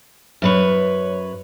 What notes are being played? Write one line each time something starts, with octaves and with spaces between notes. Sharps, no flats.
F#2 B4 C#5